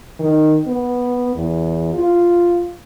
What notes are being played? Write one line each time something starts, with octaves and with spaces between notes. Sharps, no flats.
D#3
B3
E2
F4